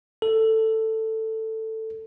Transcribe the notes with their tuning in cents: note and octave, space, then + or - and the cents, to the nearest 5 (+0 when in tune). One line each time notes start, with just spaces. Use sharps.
A4 +10